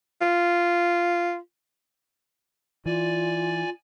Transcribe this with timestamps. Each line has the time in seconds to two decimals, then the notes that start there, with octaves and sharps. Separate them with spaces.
0.21 F4
2.86 E3 F4 D5 G#5